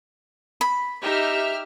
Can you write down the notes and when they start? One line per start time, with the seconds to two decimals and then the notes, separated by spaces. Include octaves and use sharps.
0.61 B5
1.02 D#4 G4 E5 F6